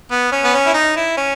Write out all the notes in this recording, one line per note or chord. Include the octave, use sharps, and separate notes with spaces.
B3
C#4
B3
C#4
E4
D#4
E4
C#4